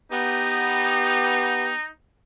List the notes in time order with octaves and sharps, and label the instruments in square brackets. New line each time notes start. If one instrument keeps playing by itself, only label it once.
[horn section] B3 G4 [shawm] D#4